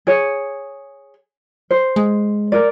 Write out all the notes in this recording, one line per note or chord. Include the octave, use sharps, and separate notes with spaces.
G#4 C#5
C5
G#3
A#4 D5